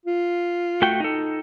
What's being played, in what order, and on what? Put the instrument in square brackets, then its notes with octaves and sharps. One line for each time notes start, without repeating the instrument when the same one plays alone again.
[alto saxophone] F4
[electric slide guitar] A3 F#4 G5
D#4 A4